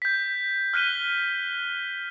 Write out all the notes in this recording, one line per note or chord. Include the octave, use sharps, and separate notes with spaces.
G6 B6
F6 F#6 B6 D#7 G7